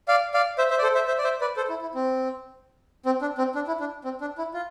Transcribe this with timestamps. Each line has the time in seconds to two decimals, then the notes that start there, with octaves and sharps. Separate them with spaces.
0.08 D5 F5
0.34 D5 F5
0.58 C5 E5
0.70 C5 E5
0.78 D5
0.83 A4 C5
0.95 C5 E5
1.08 C5 E5
1.18 D5
1.24 C5 E5
1.41 B4 D5
1.57 A4 C5
1.69 E4
1.82 E4
1.95 C4
3.06 C4
3.22 D4
3.38 C4
3.55 D4
3.67 E4
3.80 D4
4.04 C4
4.21 D4
4.38 E4
4.54 F4